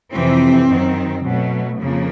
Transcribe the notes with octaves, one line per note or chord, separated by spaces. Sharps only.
F2 C3 E3 C4
F#2 D#3 F#3
B2 F#3 A3
F2 C#3 F3 A#3